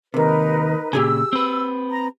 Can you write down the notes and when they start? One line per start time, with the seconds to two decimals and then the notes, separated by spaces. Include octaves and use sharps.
0.14 D#2 C3 D#4 A#4 B4
0.93 A#2 C#3 G4 G#4 G#5 E6
1.33 C4 B4
1.91 A#5